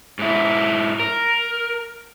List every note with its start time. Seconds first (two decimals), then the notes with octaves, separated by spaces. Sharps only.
0.19 G#2 E4
1.00 A#4